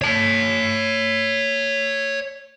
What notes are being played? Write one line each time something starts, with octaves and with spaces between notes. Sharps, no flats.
C#5 A5